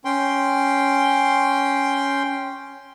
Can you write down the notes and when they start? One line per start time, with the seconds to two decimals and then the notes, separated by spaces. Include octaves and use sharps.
0.05 C#4 G5 C6